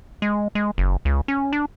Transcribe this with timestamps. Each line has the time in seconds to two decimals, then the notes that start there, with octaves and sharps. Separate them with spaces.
0.22 G#3
0.55 G#3
0.78 F#1
1.05 C#2
1.28 C#4
1.53 D4